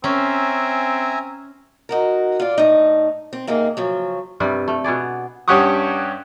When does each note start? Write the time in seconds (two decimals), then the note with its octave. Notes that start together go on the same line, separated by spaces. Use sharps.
0.04 C4 C#4 E5 G#5 A#5
1.89 D#4 F#4 A#4
2.40 F4 D5
2.58 A2 D#4
3.33 C4
3.47 C3 A#3 D#4 G#4
3.77 C#3 F3 F#3
4.40 G2 C3 G3 B4
4.68 A3
4.84 B2 B3 G#4 D5
5.48 G2 C#4 G4 F#5 C#6 D#6